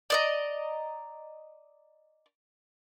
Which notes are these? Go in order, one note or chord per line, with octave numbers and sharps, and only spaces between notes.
D5 D#5 A#5